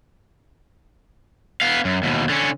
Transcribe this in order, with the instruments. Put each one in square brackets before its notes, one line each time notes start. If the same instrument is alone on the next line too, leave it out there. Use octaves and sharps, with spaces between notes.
[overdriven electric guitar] B3 F5
F#2
D#2 B2
D3 C#4